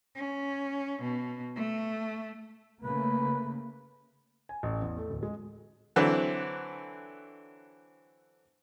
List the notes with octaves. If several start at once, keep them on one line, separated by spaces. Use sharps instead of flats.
C#4
B2
A3
C#3 A3 A#3 B4
G#5
A1
E2
A3
D1
G#3
D3 E3 F#3 C4